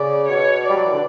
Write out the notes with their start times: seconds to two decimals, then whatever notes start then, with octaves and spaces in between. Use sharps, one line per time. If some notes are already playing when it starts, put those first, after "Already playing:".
Already playing: C#3 D5
0.29 B2 C#5
0.65 G3 D5
0.77 F#3
0.85 E3
0.93 D3